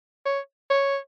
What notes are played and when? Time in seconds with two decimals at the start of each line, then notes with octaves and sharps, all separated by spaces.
0.26 C#5
0.70 C#5